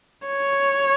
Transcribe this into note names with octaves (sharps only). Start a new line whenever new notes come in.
C#5